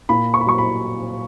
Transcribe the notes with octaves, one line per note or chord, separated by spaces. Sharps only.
A#2 B5
C#6
B5
F#3 C#6
B5